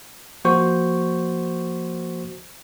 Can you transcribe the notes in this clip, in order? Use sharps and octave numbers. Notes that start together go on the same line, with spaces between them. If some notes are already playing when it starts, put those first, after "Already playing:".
F3 A#3 F#4 C5 C#6 G6